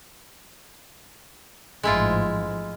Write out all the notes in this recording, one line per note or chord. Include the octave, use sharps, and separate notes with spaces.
A1 G#2 F3 G#3 E4 F4